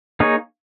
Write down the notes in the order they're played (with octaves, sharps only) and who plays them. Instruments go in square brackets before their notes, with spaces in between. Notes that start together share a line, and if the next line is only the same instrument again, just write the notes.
[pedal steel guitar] A#3 D#4 G#4 C#5